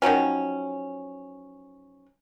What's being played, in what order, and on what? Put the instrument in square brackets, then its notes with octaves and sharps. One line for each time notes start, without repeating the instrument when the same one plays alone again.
[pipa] D#3 F3 F#3 C#4